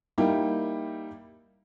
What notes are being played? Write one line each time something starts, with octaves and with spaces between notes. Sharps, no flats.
G3 A#3 D#4 E4 G5